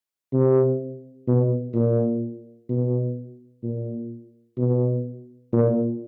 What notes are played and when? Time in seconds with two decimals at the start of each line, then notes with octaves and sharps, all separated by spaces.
0.33 C3
1.27 B2
1.74 A#2
2.69 B2
3.63 A#2
4.58 B2
5.53 A#2